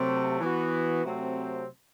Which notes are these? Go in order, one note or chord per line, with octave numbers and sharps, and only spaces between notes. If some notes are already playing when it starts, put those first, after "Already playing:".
Already playing: C3 F#3 A3
E3 B3 F#4
C3 F#3 A3 C4